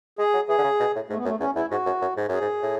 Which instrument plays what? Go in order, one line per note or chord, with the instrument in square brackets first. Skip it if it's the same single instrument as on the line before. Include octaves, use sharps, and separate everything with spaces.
[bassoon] G#3 [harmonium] G#4
[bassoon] F#3
[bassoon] E3 [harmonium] G#4
[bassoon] D3
C#3
B2
A2
[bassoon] G#2 [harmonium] A3
[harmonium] B3
[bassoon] F#2 [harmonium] A3
[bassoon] E2 [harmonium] C#4
[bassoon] E2 [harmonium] E4
[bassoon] G#2 [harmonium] F#4
[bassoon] F#2
F#2
G#2
[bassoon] F#2 [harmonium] G#4
[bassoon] G#2
A2